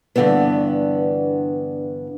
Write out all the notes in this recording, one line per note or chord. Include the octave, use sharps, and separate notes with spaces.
G2 A#2 D3 E3 B3